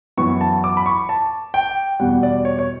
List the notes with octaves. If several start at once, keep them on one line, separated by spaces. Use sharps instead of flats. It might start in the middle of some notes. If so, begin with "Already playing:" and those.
F#2 E3 B3 C#6
A5
D6
B5
C#6
A5
G5
E2 B2 G3 F#5
D5
C#5
C#5